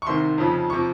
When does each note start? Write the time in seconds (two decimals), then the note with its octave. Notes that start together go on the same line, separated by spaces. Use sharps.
0.02 C#6
0.07 C2 C3 D#3 C6
0.38 F2 C#3 F3
0.70 C3 F3 C#6